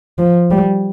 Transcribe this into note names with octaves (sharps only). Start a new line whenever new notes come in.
F3
G3